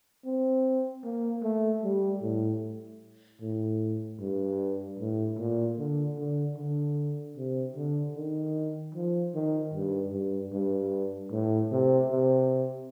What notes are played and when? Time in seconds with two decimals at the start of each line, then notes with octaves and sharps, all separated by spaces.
0.25 C4
1.04 A#3
1.43 A3
1.84 G3
2.23 A2
3.41 A2
4.21 G2
5.00 A2
5.38 A#2
5.78 D3
6.18 D3
6.58 D3
7.37 C3
7.76 D3
8.15 D#3
8.95 F3
9.35 D#3
9.74 G2
10.13 G2
10.53 G2
11.32 A2
11.72 C3
12.11 C3